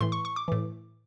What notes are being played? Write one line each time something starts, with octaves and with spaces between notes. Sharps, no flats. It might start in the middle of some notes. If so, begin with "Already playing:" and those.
A2 E3 C6
C#6
C#6
D6
A2 E3